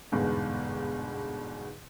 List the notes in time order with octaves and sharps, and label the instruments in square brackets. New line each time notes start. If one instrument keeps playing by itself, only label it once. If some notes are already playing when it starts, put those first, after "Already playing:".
[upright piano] G1 E2 G#2 B2